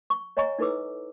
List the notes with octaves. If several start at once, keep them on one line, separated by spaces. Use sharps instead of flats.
C#6
C#5 D#5 G#5 A#5 C#6
D#4 E4 A4 B4 D6 E6